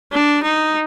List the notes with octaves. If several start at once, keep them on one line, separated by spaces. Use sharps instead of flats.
D4
D#4